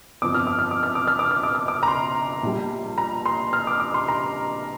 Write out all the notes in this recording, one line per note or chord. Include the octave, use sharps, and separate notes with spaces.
G1 F2 F3 D6
F6
D6
F6
D6
F6
D6
F6
D6
F6
D6
F6
D6
A#5
C6
A#1 A#2 G3
A#5
C6
F6
D6
D6
C6
A#5